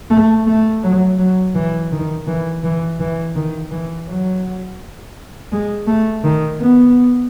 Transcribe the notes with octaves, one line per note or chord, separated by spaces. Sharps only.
A3
A3
F#3
F#3
E3
D#3
E3
E3
E3
D#3
E3
F#3
G#3
A3
D#3
B3